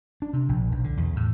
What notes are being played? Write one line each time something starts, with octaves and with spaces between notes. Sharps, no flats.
D4
C3
A#1
B1
D3
E2
A2